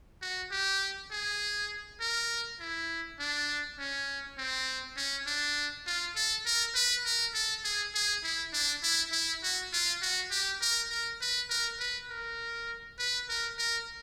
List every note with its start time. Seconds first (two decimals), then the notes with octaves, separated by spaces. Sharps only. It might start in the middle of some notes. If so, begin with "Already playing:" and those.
0.22 F#4
0.51 G4
1.11 G#4
2.00 A#4
2.60 E4
3.19 D4
3.79 C#4
4.38 C4
4.97 C#4
5.27 D4
5.87 F4
6.15 A4
6.46 A#4
6.75 B4
7.05 A#4
7.34 A4
7.64 G#4
7.95 G#4
8.24 E4
8.53 D4
8.83 E4
9.12 E4
9.43 F#4
9.73 F4
10.02 F#4
10.31 G4
10.61 A#4
10.90 A#4
11.21 B4
11.50 A#4
11.79 B4
12.10 A#4
12.99 B4
13.29 A#4
13.58 A#4